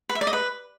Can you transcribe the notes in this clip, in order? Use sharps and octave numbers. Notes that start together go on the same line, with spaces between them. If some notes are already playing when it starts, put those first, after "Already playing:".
B4
E5
D5
D#5
B4